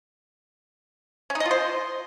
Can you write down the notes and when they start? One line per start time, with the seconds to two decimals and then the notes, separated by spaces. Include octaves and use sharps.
1.30 C#4
1.35 D#4
1.40 D#5
1.45 F4
1.51 C5